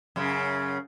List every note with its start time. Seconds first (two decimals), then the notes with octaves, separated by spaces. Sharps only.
0.16 F#2 C#3